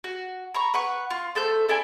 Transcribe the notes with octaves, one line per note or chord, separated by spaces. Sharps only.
F#4
A#5 B5 C#6
B4 F#5 C#6
F4
A3 A4 C5 G6
E4 A4 D5 G#5